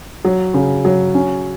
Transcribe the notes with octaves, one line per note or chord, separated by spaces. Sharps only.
F#3
C#3
F#3
C#4